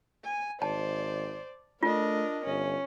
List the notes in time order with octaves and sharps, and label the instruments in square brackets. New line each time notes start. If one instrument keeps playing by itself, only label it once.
[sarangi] G#5
[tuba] G#1 [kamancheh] C5 [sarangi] D5 [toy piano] A5
[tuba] A3 [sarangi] D4 [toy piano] F4 [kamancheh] A#4 D#5
[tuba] G1 [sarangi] C#4